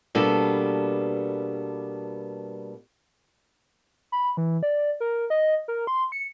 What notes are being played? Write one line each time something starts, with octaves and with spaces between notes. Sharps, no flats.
B2 G3 A#3 B3 D4 A4
B5
E3
D5
A#4
D#5
A#4
C6
C#7